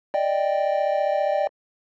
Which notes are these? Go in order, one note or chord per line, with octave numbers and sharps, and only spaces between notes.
D5 D#5 G5